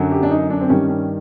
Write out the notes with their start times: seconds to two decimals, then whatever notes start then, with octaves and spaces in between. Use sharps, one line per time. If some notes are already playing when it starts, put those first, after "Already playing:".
Already playing: F#2 D3 F#3
0.11 G4
0.23 D4
0.31 D#4
0.50 D4
0.61 C4
0.70 G2 D#3 G3 C#4
0.89 C#4